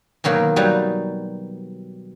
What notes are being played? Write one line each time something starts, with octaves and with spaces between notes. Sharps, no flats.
B2 D#3 F#3 A#3
F#3 G3 D#4 B4